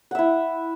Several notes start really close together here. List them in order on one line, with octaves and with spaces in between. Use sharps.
F#5 E5 E4